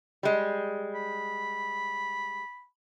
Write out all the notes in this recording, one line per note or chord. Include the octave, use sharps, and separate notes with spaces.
G3 G#3
B5